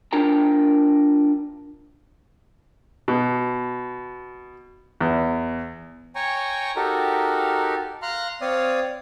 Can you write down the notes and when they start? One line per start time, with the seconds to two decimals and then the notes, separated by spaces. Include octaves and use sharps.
0.13 D4 F4 A#4 G5 A#5
3.08 B2
5.01 E2
6.15 C#5 G5 G#5 A#5 C#6
6.76 D#4 F#4 G4 A4 A#4
8.02 F5 A#5 C6 F6 F#6
8.41 C4 C#5 D5 F5 D#6